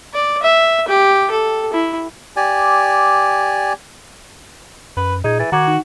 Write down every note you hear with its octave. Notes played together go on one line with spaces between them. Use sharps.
D5
E5
G4
A4
E4
G4 D5 G#5
F#2 B4
A#2 D#4 G#4 G#6
E3 A6
D#3 F#4 A#5 D6 G#6
D#4